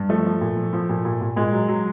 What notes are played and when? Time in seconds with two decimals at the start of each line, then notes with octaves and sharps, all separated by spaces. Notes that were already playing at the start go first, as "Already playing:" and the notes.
Already playing: G2
0.09 F3 A3
0.25 F3
0.41 A#2
0.57 F3
0.73 F3
0.89 A#2
1.05 A#2
1.21 A#2
1.36 A#2 G#3
1.52 F#3
1.68 F#3